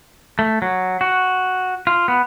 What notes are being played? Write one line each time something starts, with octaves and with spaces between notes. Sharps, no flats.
A3
F#3
F#4
F4
B3